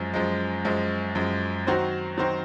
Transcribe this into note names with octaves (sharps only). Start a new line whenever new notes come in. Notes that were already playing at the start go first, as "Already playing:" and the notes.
Already playing: F#2 F3 G#3
F#2 F3 G#3
F#2 F3 G#3
F#2 F3 G#3
D#3 F#3 C4 F#4 C5
D#3 F#3 C4 F#4 C5